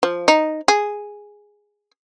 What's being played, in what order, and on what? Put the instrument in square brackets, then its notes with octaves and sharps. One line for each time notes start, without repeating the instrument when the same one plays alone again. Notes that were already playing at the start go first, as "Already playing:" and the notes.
[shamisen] F3
D#4
G#4